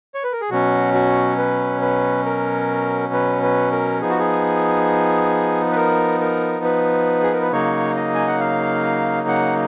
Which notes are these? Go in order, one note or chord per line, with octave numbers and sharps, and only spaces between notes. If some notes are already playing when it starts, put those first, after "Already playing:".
C#5
B4
A#4
G#4
B2 F#3 C#4 F#4
F#4
B4
B4
A#4
B4
B4
A#4
F3 B3 D#4 G#4
F#4
G#4
B4
A#4
A#4
B4
G#4
A#4
B4
C#3 F#3 A#3 D#4 C#5
D#5
G#5
F#5
F5
F#5